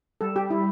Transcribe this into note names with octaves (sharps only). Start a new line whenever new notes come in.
G3 A4
G4
E4